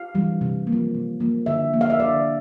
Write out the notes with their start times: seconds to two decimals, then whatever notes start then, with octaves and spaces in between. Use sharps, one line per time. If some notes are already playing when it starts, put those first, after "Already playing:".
Already playing: F5
0.15 E3 G3
0.41 C3
0.67 A#3
0.73 F3
0.95 C3
1.20 F3 A#3
1.46 D3 E5
1.73 F3 A#3
1.81 F5
1.90 E5
2.00 D3 D5